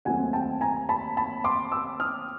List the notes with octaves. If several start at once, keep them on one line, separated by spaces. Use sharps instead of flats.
D#2 D#3 F#3 A3 C4 F#5 G#5
G5 A5
G#5 A#5
A5 B5
A5 B5
C6 D6
D6 E6
D#6 F6